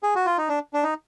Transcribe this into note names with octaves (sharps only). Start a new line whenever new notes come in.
G#4
F#4
F4
D#4
D4
D4
D#4